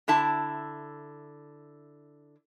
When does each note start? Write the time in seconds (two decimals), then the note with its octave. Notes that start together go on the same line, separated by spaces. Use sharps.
0.08 D3 E4 E5 A5